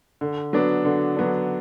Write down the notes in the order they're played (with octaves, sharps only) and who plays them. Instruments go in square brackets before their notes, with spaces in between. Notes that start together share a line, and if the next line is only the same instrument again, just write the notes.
[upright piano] D3
F#3 B3 D4
D3
F#3 B3 D4